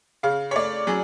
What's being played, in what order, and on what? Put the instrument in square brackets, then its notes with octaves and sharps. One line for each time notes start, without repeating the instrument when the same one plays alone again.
[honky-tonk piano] C#3 F5
C#5
A3 D5
F#3 G#4